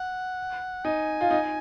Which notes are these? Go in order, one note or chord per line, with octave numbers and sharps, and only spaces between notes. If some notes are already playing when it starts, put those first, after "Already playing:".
Already playing: F#5
D#4 G#5
F4
D#4